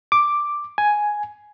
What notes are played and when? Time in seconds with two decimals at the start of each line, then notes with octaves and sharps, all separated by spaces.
0.12 D6
0.78 G#5